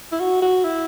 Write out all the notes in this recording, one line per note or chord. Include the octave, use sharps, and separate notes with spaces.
E4
F#4
F#4
E4